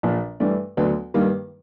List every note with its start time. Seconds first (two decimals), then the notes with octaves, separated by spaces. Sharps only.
0.03 A#1 A#2 F3
0.40 G2 E3 A3 D4
0.77 D2 D3 F#3 B3 D4
1.14 G2 D#3 G3 A#3